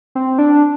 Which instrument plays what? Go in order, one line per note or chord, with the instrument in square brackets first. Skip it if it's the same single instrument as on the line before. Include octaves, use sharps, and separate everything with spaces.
[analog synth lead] C4
D4